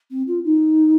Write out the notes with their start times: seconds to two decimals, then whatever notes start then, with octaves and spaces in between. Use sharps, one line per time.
0.10 C4
0.27 F4
0.44 D#4